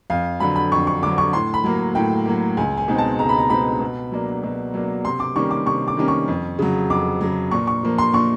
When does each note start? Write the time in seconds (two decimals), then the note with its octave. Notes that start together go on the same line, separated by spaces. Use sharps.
0.10 F2 F5
0.40 D3 F#3 B5
0.56 B5
0.72 F2 C#6
0.87 C#6
1.02 D3 F#3 D6
1.18 C#6
1.33 A2 C6
1.54 B5
1.64 F#3 A#3
1.95 A2 G5
2.25 F#3 A#3
2.57 C#2 G#5
2.77 G#5
2.88 B2 G#3 C4 D#4
2.98 A5
3.19 C#2 A#5
3.29 B5
3.39 A#5
3.49 B2 G#3 C4 D#4 B5
3.80 B2
4.12 F#3 A#3 D4
4.43 B2
4.74 F#3 A#3 D4
5.05 C3 C6
5.20 D6
5.35 D#3 G3 A#3 C#4 C#6
5.51 D6
5.66 C3 C#6
5.88 D6
5.97 D#3 G3 A#3 C#4
6.08 C#6
6.28 F2
6.59 C#3 F#3
6.90 F2 D6
7.21 C#3 F#3
7.51 A#2 C#6
7.67 C#6
7.83 F3 A#3
7.98 C6
8.13 A#2 C#6